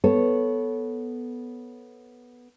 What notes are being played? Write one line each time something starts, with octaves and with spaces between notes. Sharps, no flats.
B3 A4 C#5